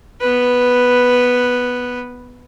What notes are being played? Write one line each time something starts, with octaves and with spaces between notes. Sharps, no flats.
B3 B4